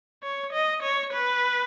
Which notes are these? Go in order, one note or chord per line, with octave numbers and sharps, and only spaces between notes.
C#5
D#5
C#5
B4